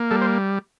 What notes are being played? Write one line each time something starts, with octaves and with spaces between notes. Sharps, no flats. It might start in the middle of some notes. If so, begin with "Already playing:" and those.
Already playing: A#3
G3 A4
C5